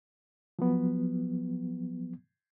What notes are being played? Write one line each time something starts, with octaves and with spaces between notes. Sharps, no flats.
F3 F#3 B3